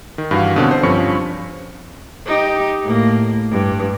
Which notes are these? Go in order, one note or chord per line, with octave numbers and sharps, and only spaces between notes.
D#3
G2 E3 F#4 F5
B2 D3 C4 C#4
C5
G2 F3 C4 C#4 C#6 C#7
D#4 G4
A2 A#3
G2